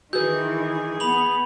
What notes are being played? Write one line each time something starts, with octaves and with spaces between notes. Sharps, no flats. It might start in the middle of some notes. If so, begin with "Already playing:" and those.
D#3 E3 F#4 G#4 B4 G6
B3 B5 F7 F#7